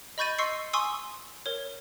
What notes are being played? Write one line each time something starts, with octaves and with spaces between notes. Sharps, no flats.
D#5 B5 C#6 G6 A6 D#7
D#5 C6 C#6 E6 C7 C#7
G#5 C6 C#6 D#6 E6
A#4 C#5